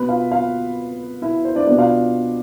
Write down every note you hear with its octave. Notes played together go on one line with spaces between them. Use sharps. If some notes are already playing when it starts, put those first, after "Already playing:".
Already playing: B2 B3 B4 B5
F4 F5
F4 F5
E4 E5
C5
D4 D5
B2 B3 D4 D5
F4 F5